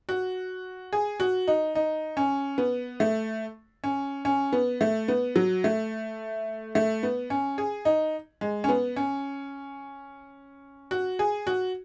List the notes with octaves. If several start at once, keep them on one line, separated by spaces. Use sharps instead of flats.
F#4
G#4
F#4
D#4
D#4
C#4
B3
A3
C#4
C#4
B3
A3
B3
F#3
A3
A3
B3
C#4
G#4
D#4
G#3
C#4
B3
C#4
F#4
G#4
F#4